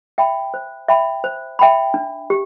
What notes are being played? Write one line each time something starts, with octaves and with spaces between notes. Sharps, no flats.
E5 G5 B5
C5
E5 G5 B5
C5
E5 G5 B5
D4
G4